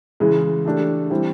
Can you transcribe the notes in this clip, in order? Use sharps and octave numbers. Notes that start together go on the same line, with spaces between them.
C#3 E3 G#3
E3 A3 D4 G4
E3 G3 C4 E4